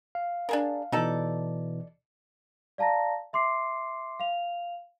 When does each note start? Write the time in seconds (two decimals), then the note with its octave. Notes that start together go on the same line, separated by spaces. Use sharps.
0.15 F5
0.49 D4 G#4 A#4
0.92 B2 E3 D#4 A4 D5
2.78 D5 F5 A5 A#5 A#6
3.33 E5 C6 D6 C7
4.19 F5 F7